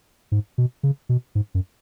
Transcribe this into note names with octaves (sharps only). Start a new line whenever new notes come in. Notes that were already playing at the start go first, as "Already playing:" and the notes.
G#2
B2
C#3
B2
G#2
F#2